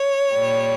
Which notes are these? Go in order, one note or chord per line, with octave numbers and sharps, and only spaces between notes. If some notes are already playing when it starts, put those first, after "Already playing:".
Already playing: C#5
A#2 G3